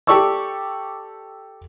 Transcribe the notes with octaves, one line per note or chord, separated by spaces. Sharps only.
G4 A4 D5 C#6 D6 E6